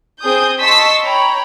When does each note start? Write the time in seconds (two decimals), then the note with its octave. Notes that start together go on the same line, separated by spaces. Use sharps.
0.21 C4 G#4 D#6 G6
0.61 D#5 A5 C6 C#6 E6 B6
1.04 C#5 G5 A#5 B5